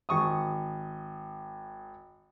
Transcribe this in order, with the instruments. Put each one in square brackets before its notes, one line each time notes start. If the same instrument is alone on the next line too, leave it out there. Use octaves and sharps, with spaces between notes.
[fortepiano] G#1 C#6 D#6